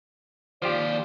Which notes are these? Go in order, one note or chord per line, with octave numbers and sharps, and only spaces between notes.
D#2 F3 F4 G4 C5 D5